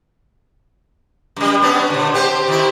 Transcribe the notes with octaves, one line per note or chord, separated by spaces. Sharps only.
F#2 G3
B3 C#4 D4
A#2 D3
C4 G4 C5
D#3 E4